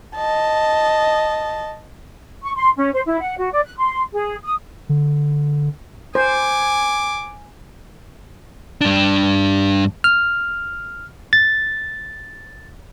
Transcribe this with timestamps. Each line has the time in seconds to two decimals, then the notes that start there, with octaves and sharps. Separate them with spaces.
0.16 D#5 A5
2.42 C#6
2.55 C6
2.76 C#4
2.92 C5
3.05 E4
3.20 F#5
3.38 F#4
3.51 D5
3.64 F#6
3.76 C6
4.11 G#4
4.42 D#6
4.89 D3
6.15 C5 G#5 D6
8.81 G2 D4
10.04 F6
11.33 A6